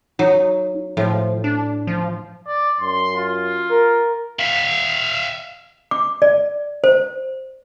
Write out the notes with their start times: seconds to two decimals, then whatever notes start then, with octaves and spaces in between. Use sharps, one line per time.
0.19 F#3 D#4
0.97 A2 F3
1.44 D4
1.87 F3
2.46 D5
2.80 F#2 C6
3.16 F4
3.71 A#4
4.39 E5 F5
5.91 D6
6.22 D5
6.84 C5